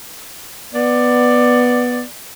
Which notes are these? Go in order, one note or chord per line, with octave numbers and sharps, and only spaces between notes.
B3 D5